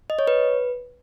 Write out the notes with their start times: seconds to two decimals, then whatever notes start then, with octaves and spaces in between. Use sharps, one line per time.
0.10 D#5
0.19 C#5
0.27 B4